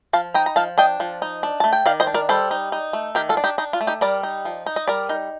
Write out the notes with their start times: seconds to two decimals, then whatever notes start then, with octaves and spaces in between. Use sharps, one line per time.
0.13 F3 F5 A5
0.34 D#4 G5 A#5
0.46 A#5
0.56 F3 F5 A5
0.78 D4 D#5 G5
1.00 F3
1.22 D#4
1.43 D4
1.60 A3 A5
1.73 G5
1.86 D#3 D5 F5
2.00 C5 D#5
2.07 D4
2.14 A#4 D5
2.29 G3 A4 C5
2.51 D#4
2.72 D#4
2.93 A3
3.15 D#3 G4 A#4
3.29 F4 A4
3.37 D4
3.44 D#4 G4
3.58 D4 D#4
3.73 F4
3.81 A3
3.87 D#4 G4
4.01 G3 A#4 D5
4.23 D#4
4.45 F3
4.66 D#4
4.76 D#5
4.88 G3 A#4 D5
5.09 D#4